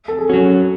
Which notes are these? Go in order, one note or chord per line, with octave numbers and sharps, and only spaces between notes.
A4
G#4
F#3 C#4 F#4